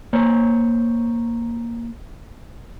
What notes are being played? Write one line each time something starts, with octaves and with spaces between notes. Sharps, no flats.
A#3 C5 C#5